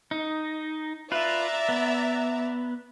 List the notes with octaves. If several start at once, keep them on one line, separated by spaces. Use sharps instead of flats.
D#4
F4 B4 D5 E5 A#5
B3